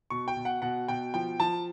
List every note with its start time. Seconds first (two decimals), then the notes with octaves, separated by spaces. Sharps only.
0.10 B2 C#6
0.28 G5
0.37 B2
0.45 F#5
0.62 B2 F#5
0.88 B2 G5
1.14 F3 G5
1.40 F3 A5